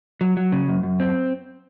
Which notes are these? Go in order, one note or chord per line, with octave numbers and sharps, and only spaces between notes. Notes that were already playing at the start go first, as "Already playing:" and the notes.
F#3
F#3
C#3
F#2
F#2
C4